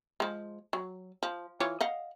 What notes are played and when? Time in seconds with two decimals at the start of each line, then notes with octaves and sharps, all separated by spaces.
0.20 F3 G#3
0.73 F#3
1.23 F3
1.60 E3 F4 C#5
1.81 D#5 F5 F#5